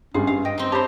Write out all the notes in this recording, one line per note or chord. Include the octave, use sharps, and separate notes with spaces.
G#1 G3 C#4 G#4 C6
G2 F5
D#5 G5
C4 D#4
G4 C5 C#5 A5 B5